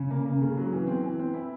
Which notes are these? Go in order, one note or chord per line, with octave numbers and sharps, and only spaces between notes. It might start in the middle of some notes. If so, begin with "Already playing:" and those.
Already playing: C#3
A#3
A#3
C#3
F#3
E3
C4
E3
C4
E4